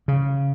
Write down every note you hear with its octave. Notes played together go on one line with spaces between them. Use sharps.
C#3